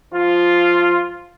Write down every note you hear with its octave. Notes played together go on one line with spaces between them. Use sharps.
F3 F4